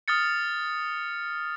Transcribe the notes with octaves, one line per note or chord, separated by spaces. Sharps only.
D#6 F6 A6 C#7